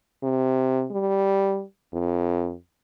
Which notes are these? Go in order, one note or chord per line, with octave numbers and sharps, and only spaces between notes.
C3
G3
F2